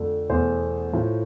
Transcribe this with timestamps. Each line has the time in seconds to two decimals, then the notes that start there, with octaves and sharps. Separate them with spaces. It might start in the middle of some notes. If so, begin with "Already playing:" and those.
Already playing: F2 D3 A3
0.30 E2 B2 A3 C5
0.92 A2 F3 A3